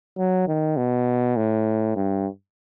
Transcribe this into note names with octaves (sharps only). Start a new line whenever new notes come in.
F#3
D#3
B2
A2
G2